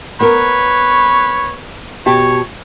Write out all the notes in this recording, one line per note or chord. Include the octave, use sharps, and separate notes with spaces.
B3 A#4 B4 C#5
B2 G4 C#5 A5